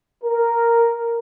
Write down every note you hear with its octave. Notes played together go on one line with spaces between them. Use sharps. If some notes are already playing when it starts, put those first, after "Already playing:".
A#4